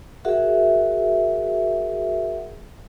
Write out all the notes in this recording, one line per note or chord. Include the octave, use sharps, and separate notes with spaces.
F#4 G#4 A#4 E5 F#5